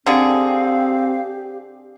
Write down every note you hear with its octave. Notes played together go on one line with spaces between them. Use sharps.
D3 C4 G4 G#4 F5